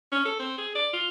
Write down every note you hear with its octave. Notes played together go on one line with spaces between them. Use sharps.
C#4
A4
C4
G#4
D5
F4